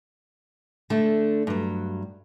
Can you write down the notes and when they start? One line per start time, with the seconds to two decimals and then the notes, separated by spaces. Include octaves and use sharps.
0.90 D3 A3 D4
1.47 G2 F#3